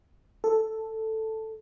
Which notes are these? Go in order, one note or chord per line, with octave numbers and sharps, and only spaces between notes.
A4